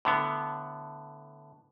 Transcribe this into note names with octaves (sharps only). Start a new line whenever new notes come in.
A2 D3 B3